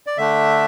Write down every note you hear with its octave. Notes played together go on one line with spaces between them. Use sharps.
D5
D3 A3 D4 E5